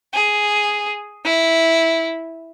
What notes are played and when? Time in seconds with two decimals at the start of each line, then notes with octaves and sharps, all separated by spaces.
0.13 G#4
1.25 E4